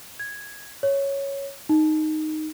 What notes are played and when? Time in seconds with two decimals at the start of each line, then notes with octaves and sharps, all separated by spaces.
0.19 G#6
0.83 C#5
1.69 D#4